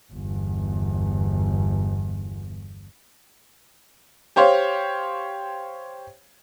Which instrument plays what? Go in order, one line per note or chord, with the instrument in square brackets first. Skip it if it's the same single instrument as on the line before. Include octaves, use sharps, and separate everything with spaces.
[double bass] G1 E2
[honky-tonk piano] G4 C5 C#5 F5